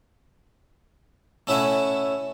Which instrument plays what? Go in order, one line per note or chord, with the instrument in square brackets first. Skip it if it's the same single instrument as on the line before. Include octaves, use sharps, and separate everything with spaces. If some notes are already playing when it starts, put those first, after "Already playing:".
[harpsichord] A3 C#4 E4 E5 F#5 G#5